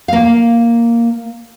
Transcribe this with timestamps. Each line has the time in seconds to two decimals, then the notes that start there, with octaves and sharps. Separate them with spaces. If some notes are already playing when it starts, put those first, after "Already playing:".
0.08 A#3 F5